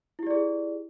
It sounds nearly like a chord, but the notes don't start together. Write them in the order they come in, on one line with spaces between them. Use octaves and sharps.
E4 G4 D5 G#4